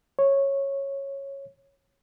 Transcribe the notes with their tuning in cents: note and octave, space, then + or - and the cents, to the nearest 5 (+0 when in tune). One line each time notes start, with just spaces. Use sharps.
C#5 -10